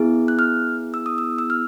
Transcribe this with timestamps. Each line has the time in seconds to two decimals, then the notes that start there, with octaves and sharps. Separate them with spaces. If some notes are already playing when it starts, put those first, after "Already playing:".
Already playing: B3 E4 G#4
0.28 F#6
0.39 F6
0.94 E6
1.06 D#6
1.18 E6
1.38 E6
1.50 F6